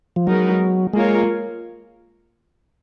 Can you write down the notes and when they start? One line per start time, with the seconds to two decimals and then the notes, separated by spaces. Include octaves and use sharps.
0.16 F3
0.27 F#3 G#3 B3 D#4 A#4
0.93 G#3 A#3 F4 A#4 C#5